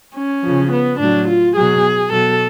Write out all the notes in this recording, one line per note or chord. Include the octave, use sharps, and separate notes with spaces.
C#4
C#3 F3
B3
A2 F#3 D4
F4
B2 F#3 G#4
B2 F#3 A4